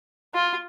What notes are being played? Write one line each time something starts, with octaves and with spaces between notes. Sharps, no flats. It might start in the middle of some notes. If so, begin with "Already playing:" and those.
F4